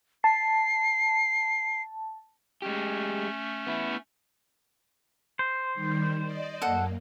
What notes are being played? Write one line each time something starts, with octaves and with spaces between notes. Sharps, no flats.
A5 C7
G#3 A3 C#4 G4
B3 E4
C5
D#3 G3
D5 D#5
F#2 A#3 A4 F#5